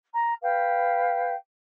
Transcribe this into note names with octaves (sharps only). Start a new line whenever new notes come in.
A#5
B4 F5 G5